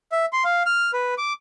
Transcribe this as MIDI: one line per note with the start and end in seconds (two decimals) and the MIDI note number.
0.12 0.26 76
0.33 0.44 84
0.44 0.63 77
0.66 0.91 89
0.93 1.14 71
1.18 1.33 86